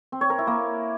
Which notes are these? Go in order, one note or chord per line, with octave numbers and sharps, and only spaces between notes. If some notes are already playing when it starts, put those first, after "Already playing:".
C4
C#5
A#4
E4
A#3